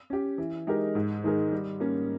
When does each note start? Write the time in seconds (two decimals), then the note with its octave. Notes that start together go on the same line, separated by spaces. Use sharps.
0.10 C#4 G4
0.38 E3
0.67 G#3 D#4 G4 A#4
0.95 G#2
1.24 D#3 G#3 D#4 A#4
1.52 G3
1.80 A#3 C#4